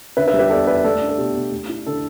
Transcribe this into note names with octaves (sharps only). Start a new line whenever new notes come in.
D3 B4 E5
B4 E5
G3
G4 B4
E2 A4 D5
E2 B4 E5
A3 A4 D5
D4
A4
B2 G4
B2
A3
E4
D3 A4